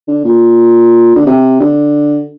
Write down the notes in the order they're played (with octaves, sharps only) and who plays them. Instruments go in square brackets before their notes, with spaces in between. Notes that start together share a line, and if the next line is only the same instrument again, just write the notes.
[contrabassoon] D3
A#2
D3
C3
D3